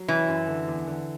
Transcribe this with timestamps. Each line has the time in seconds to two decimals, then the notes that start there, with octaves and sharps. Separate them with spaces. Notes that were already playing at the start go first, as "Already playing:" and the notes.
Already playing: F#3
0.08 E3 C#4
0.28 F#2
0.48 D3
0.68 E2
0.88 D3